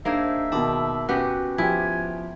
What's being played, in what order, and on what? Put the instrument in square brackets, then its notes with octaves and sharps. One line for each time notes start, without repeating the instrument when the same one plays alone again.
[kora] A#3 D#4 G#4 [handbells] D4 C5 [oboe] E5
[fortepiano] B2 D#3 [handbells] A5 B5 D6
[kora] B3 F#4 G4 [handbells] C#4 B4
[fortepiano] F3 G4 [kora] E4 [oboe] G#5